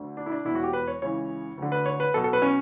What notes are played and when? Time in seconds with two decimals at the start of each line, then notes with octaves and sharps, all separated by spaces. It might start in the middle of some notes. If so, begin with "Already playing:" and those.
Already playing: D2 D3
0.17 D4
0.26 E4
0.32 D4
0.45 E1 E2 B2 E4
0.55 F#4
0.63 G4
0.73 B4
0.88 C#5
1.02 C#2 C#3 E3 C#5
1.58 D2 D3
1.72 B4
1.86 C#5
2.00 B4
2.14 B1 B2 A4
2.24 A4
2.33 B4
2.42 C#4